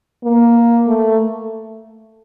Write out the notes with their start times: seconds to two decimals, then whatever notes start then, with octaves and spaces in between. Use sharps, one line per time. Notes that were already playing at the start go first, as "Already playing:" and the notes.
0.24 A#3
0.88 A3